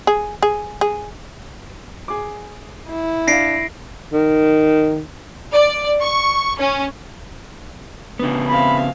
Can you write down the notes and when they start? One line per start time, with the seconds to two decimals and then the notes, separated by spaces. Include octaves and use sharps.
0.07 G#4
0.42 G#4
0.81 G#4
2.08 G#4 D6
2.90 E4
3.27 D4 F5 A#6 C7 D7
4.13 D#3
5.52 D5
6.00 C#6
6.58 C#4
8.19 C#3 B3 D4
8.49 C4 E5 F5 B5